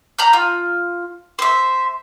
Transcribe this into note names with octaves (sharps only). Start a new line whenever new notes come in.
A#5 B5 G6
F4
C5 E5